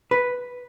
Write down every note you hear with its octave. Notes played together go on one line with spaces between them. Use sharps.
B4